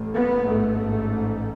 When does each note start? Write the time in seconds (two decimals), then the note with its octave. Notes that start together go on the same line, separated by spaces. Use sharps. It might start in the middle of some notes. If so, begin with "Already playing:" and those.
Already playing: A1 A2
0.12 B3
0.45 A1 G#2 A3